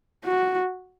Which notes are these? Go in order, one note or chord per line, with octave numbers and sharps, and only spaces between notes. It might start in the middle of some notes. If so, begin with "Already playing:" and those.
F#4